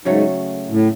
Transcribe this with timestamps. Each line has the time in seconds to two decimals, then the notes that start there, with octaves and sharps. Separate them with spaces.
0.05 G#2 C#3 F#3 A3
0.69 A2